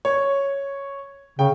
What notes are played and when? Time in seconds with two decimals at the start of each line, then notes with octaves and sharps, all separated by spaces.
0.05 C#5
1.39 C#3 G5